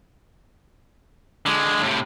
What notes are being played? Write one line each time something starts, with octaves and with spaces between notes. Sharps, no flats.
D3 G#3
A2 C3